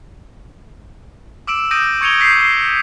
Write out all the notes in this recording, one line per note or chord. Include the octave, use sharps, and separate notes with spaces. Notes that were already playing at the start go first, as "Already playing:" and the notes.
D6 E6 D7 E7
D#6 G6 A#6 D7 D#7
C#6 G#6 C#7 D#7 F7 G7
G6 B6 C7
C7